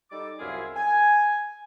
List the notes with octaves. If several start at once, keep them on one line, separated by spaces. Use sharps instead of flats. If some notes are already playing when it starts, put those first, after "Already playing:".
G3 D#4 A4 D6
C2 F#2 C4 E4 G#4 F5
G#5